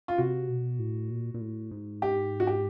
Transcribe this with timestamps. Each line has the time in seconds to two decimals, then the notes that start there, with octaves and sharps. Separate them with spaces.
0.08 F4
0.18 C3 F#4
0.49 B2
0.79 A2
1.10 A#2
1.34 A#2
1.41 A2
1.71 G#2
2.02 G4
2.40 F#4
2.47 G4